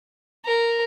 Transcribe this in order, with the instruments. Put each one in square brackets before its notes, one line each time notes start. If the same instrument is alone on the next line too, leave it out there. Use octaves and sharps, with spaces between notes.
[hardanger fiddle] A#4